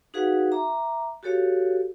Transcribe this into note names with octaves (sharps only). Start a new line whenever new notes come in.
D#4 F#4 G#4 B4 F5 F#5
E5 A#5 D6
F#4 G4 A4 C#5 F5